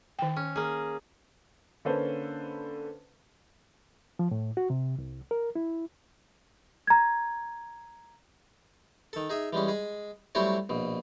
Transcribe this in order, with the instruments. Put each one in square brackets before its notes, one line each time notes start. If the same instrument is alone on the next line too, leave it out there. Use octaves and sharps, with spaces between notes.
[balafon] D#3 G5
[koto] C#4
A#3 G#4
[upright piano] D3 A#3 C#4 A4 B4 C5
[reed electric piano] F3
A2
F#4
C3
C2
A#4
E4
[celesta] A#5 G#6
[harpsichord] D#3 A4
D#4 G#4 E5
E3 G3 G#3 C#4
G#3 G#4
F#3 G3 A3 C4 E4 C#5
A#1 B2